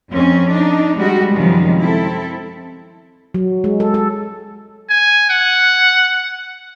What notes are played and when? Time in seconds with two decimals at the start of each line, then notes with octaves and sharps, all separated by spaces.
0.11 F2 C4 C#4
0.51 D4 D#4
0.96 G3 G#3 F#4
1.32 F#2 C3 D#3 F3 G3 G#3
1.82 C4 E4 A4
3.34 F#3
3.64 G#3
3.80 A4
3.94 A4
4.90 G#5
5.30 F#5